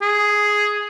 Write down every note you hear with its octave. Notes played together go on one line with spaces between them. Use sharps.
G#4